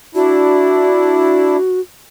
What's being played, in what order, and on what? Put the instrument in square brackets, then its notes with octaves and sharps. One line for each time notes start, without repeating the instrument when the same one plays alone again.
[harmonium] D4 E4 [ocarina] F#4